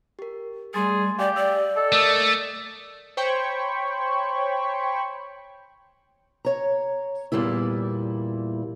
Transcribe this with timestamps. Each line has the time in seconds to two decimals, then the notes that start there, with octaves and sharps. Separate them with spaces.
0.19 G4 A#4
0.74 G3 A3 G#4 C6 A6
1.19 G4 D5 F5 G5 G#5
1.36 D5 E6
1.76 A4 D#5 E6
1.92 A3 A#4 D6 D#6
3.17 C5 C#5 G5 B5 C#6
6.45 C#5 A#5
7.32 E2 A#2 G3 A#3 E4